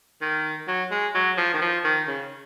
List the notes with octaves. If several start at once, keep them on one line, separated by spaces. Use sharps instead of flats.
D#3
F#3
G#3
F#3
F3
D#3
F3
D#3
C#3